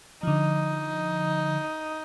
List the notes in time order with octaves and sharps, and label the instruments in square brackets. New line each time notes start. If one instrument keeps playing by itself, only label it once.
[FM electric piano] D3 F3 [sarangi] D#4